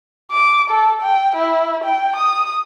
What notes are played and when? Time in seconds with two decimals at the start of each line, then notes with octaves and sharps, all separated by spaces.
0.32 D6
0.70 A4
1.02 G5
1.36 E4
1.84 G5
2.16 D#6